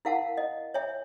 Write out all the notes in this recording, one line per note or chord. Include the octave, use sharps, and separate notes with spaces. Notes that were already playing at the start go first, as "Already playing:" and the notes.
E4 A#4 F5 F#5 A5
D#5
C#5 E5 G#5